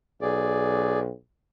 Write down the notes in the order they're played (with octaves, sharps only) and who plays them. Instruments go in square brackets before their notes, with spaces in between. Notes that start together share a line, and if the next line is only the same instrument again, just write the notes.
[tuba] B1 [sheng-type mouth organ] G#4 D5